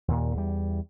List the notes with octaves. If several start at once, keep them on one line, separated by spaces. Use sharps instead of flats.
D#2 A#2
E2 G3